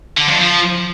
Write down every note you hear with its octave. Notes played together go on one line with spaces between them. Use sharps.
D3
F2
F3